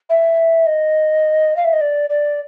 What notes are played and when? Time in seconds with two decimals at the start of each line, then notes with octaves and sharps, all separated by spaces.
0.10 E5
0.66 D#5
1.56 F5
1.65 E5
1.73 D#5
1.81 D5
2.10 D5